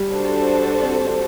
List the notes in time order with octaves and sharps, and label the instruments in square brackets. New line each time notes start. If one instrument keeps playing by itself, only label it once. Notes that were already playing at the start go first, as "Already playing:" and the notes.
Already playing: [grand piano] G3
[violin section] D4 F#4 A4 C5
[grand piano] C4
C4